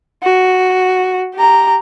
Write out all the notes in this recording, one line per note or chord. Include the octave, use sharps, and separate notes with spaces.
F#4
G4 A#5